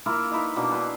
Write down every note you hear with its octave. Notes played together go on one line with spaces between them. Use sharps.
A#3 E4 F4 A#4
D#4 E4 B4
B2 A#3 D4
B4 G#5 C6